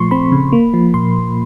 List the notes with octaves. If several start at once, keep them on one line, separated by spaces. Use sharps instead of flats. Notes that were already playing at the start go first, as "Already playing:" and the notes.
Already playing: A#2 F3 A3 C6 C#6
C4 B5
C#3
A#3
F3
A#2 C6